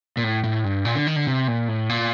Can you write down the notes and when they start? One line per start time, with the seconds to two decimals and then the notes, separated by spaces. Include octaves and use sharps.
0.17 A#2
0.24 A2
0.44 A2
0.64 G2
0.85 A#2
0.95 D3
1.07 D#3
1.16 D3
1.27 C3
1.48 A#2
1.68 A2
1.89 A#2